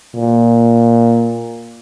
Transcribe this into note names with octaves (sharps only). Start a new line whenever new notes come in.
A#2